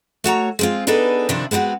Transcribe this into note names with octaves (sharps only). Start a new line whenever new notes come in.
A3 F#4 C#5 A#5
G#3 C4 F4
B3 D4 D#4 G#4 A4 B4
C3 D#3 F3 C4 D4 E4
G#3 B3 C4 F4 F#4